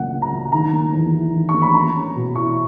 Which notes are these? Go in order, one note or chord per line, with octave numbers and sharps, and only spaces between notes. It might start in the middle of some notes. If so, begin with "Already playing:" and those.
Already playing: C#2 C#3 F#3 A#3 F#5
C#3
A#5
F#3
D#3 A#5
A#3
E2
E4
D#3
C#6
A#3
B5
A#3 A#5
C#4
B2
E4 C#6